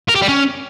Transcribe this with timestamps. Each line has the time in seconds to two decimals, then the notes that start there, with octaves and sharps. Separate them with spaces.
0.09 A#4
0.15 G4
0.22 G3
0.29 C#4